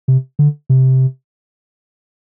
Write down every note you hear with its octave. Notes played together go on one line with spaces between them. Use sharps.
C3
D3
C3